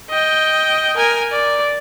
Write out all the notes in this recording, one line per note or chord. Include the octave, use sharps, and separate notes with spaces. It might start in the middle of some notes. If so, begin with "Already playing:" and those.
D#5 G5
A#4 G#5
D5